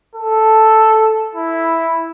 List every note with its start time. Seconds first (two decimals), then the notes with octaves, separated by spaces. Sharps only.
0.15 A4
1.35 E4